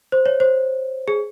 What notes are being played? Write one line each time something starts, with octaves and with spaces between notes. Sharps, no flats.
C5
C#5
C5
G#4